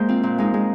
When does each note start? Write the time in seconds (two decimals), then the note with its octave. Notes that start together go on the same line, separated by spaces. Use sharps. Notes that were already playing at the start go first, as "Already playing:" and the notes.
Already playing: G#3 A#3 C5
0.09 C4 F4
0.23 A#2
0.38 G#3 D#4
0.54 G#3